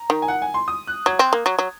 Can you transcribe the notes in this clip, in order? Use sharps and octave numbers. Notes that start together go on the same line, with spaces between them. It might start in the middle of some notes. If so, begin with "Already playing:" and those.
Already playing: A#5
D#3
G#5
F#5
G#5
C6
D#6
F#6
F#3 G#6
C4
A#3
F#3
F#3